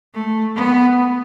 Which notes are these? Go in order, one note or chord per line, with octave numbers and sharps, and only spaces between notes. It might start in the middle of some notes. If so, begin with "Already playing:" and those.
A3
B3